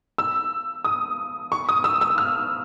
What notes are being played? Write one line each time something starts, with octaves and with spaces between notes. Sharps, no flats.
E6
D#6
C#6
D#6
E6
E6
F6